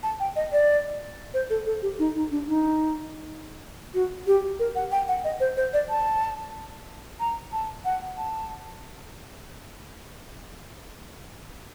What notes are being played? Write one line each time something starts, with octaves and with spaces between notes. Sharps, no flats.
A5
G5
D#5
D5
C5
A4
A4
G4
D#4
D#4
D4
D#4
F#4
G4
A#4
F#5
G5
F#5
D#5
C5
C5
D5
A5
A#5
A5
F#5
A5